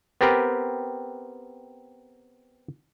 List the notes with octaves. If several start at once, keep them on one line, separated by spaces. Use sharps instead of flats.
B3 C4 G4 A#4 B4